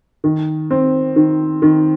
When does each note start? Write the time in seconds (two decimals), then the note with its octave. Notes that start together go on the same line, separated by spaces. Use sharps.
0.24 D#3
0.71 C4
1.16 D#3
1.62 D#3